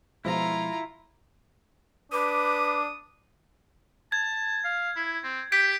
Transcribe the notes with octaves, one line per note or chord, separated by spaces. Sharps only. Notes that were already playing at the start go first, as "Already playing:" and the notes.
B2 F3 G#3 E4 F4 A#5
D4 B4 D6 D#6
A5 G#6
F5
E4
C4
G4 G6 B6 D7